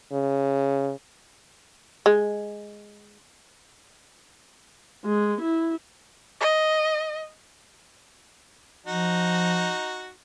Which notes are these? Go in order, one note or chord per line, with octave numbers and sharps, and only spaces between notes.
C#3
G#3
G#3
E4
D#5
F3 D#4 F#4